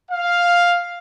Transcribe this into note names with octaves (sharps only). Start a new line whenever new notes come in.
F5